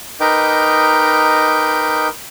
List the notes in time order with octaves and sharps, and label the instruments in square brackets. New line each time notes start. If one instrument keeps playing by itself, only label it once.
[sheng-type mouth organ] D#4 A#4 B4 D#5 G5 D6